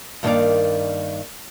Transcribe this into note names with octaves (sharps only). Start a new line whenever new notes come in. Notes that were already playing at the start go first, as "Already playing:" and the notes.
G2 D#3 A#3 A4 A#4 D5